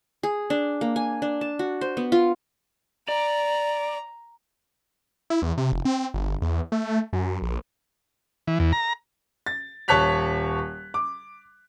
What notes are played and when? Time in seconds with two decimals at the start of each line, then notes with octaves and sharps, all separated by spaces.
0.23 G#4
0.50 D4
0.81 A#3
0.96 G#5
1.22 D4
1.41 A5
1.59 F#4
1.81 C5
1.97 B3
2.12 F4
3.09 D5 A#5
5.30 E4
5.42 E2
5.58 C3
5.72 F1
5.85 C4
6.14 G1
6.42 E2
6.72 A3
7.13 F#2
7.42 A#1
8.48 E3
8.60 E2
8.73 A#5
9.46 A6
9.88 D#1 C#5 A5 F#6 B6 F7
10.94 D6